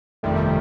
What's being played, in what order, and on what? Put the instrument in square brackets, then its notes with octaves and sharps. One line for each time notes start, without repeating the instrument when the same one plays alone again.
[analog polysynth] G1 F2 C3 D#3 G3 [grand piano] A3